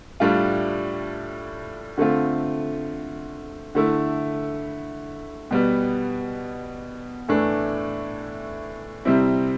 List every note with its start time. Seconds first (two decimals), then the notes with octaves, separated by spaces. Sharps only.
0.20 A2 G3 D4 F4
1.97 D3 A3 C4 F4
3.75 D3 A3 E4
5.51 B2 G3 B3
7.29 A2 E3 A3 D4
9.05 C3 G3 C4 E4